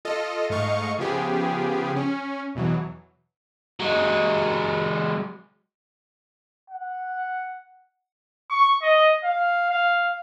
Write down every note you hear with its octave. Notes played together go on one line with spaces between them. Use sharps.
F4 A4 D#5
G#2 A3 D#5 F5 C#6
C#3 F3 B3 G4 G#4
C#4
E2 B2 E3 F#3
F#3 G#3
F#5
C#6
D#5
F5
F5